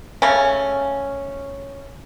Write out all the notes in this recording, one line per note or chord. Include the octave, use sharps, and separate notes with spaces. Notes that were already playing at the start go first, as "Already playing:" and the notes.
C#3 A3 C#4